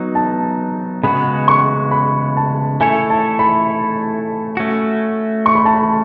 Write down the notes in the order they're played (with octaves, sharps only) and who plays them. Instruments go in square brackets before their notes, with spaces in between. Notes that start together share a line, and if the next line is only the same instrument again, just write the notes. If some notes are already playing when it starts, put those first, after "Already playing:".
Already playing: [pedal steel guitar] F#3 B3 D#4
[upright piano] A5
[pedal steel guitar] C#3 G#3 B3 F#4 [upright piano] B5
[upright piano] C#6
B5
A5
[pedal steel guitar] A3 E4 A4 C#5 [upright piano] G#5
[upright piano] A5
B5
[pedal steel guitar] A3 C#4 F#4
[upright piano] C#6
B5
A5
B5